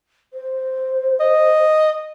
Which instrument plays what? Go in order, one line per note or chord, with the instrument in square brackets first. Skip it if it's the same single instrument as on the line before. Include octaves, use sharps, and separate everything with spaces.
[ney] C5
[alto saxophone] D#5